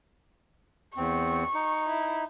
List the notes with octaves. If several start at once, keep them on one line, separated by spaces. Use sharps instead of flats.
E2 C4 C#6
D#4
E4